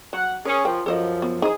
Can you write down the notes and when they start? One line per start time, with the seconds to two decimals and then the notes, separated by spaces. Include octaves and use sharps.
0.13 F#3 F#5
0.45 C#4 G#4 A#4
0.65 F3 A#4 C5 G5
0.86 F#2 F3 A4 C5 D#5
1.22 B3
1.42 D#4 G#4 C5